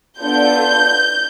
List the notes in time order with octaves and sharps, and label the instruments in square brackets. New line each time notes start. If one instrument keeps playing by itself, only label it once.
[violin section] B3 D4 F4 A4 G6